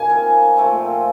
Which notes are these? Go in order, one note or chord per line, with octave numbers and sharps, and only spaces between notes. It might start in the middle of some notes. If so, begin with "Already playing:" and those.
Already playing: A#3 D#4 G#5
C4 F4 A#4
A#2 F3 A3 C4